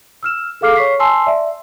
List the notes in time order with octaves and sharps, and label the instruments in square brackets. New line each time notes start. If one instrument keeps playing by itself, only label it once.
[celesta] E6 F6 E7
G#4 A4 F5 D6 F6 C7
C#5 C#6 B6 C7
G#5 A5 C6 E6 C7
D5 E5